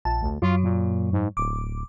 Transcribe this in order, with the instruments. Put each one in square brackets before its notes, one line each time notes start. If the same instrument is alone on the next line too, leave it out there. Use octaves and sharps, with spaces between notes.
[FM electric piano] A#1 A5
[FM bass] D2
[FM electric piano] F#2 F#3 [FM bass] F4
[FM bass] A#2
G#2
[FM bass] D1 [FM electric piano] D6